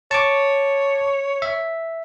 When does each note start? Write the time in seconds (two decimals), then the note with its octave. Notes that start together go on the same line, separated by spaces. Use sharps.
0.11 C#5 A5 C#6 D6
1.42 E5